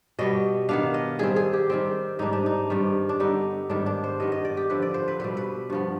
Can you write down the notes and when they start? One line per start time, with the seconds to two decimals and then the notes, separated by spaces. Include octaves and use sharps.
0.19 B2 G3 B3 D#5
0.69 D#3 B3 D4 F5
0.94 D#5
1.19 D#3 G3 C4 G#4
1.36 G#4
1.53 G4
1.70 D#3 G3 C4
2.19 G#2 G3 D4 D#4
2.33 D4
2.46 D#4
2.70 G2 D#3 G3 C4
3.09 D4
3.20 D3 G3 B3 D#4
3.70 G#2 D#3 G3 B3 D4
3.86 D4
4.04 C5
4.20 G2 D#3 G3 B3 D#5
4.32 D#5
4.45 D5
4.57 G4
4.70 D3 F3 C4 B4
4.82 D5
4.94 C5
5.08 B4
5.20 B2 G3 C4 B4
5.37 B4
5.70 G2 F3 B3